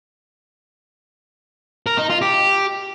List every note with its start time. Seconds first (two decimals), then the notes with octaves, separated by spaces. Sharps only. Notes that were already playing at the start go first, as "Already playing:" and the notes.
1.86 A#4
1.98 D#4
2.10 F4
2.22 G4